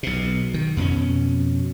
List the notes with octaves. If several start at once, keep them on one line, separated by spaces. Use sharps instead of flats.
B1 B2
D#3
F2 B2 F#3 C#4